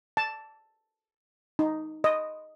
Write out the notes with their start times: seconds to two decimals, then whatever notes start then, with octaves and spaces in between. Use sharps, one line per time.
0.17 A5
1.59 D#4
2.04 D#5